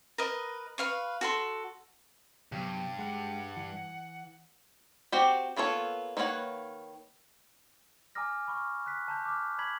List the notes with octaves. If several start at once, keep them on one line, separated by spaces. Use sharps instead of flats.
A#4 B4 D#5
B4 F5 C#6
F#4 A4 C6
G2 C3 F#3 B3
G#3 F#5
E3
C4 F#4 G4
A#3 B3 F4 A4 C#5
D#3 A#3 B4 C#5 F#5
G#5 A#5 D6 D#6 F6 A#6
B5 C#6 F6
F#6 B6
A5 A#5 G6
D6 F6
A#5 B5 G#6 B6 F#7